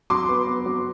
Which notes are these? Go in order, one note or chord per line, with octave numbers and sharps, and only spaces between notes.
F#3 C6 D6
B3
B3
F#3